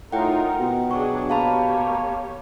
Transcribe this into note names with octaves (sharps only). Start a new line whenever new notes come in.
A2 D#4 F4 A#4 F#5 G5
B2
F#3 D4 G#4 C#6
A#3 G4 C#5 F5 A5 B5